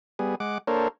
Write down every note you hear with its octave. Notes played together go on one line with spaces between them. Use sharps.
G3 B3 G#4
G#3 F#5 D6
A#3 D4 A4 A#4 C5 C#5